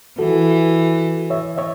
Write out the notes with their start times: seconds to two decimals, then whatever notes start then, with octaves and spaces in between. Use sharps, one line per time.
0.19 E3 F#4 A4
1.30 C#5 E5
1.58 C#5 E5